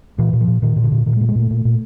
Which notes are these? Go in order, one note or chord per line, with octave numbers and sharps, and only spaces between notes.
A#2 E3
A#2
F3
A#2
A#2 D#3
A#2
D3
A#2
A#2 D#3
G#3
A#2
G#3
A#2 A3
A#2
A#2